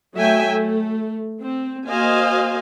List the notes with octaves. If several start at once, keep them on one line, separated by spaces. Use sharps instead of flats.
F#3 A3 E5 G5 G#5
A3
C4
A#3 F#4 C5 D#5 F5 G#5